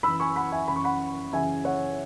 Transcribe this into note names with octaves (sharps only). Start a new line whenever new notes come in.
F#2 E3 B5 E6
G#5 C#6
F#5 B5
E5 G#5
F#2 E3 B5
C#6
F#5 B5
F#2 C#3 E3 E5 G#5
C#5 F#5